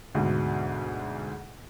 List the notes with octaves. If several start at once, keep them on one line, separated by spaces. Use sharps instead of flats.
D2 G#2 B2